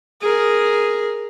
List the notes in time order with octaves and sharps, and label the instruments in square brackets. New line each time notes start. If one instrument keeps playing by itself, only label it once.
[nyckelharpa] G#4 A#4